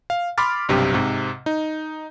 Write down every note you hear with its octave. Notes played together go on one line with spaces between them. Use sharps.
F5
B5 C6 D6 F6 A6
B1 G2 C3 G4
G#2 C3
D#4